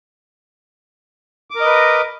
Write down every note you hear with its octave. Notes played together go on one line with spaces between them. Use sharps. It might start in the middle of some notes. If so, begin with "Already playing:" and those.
A#4 B4 D#5 D6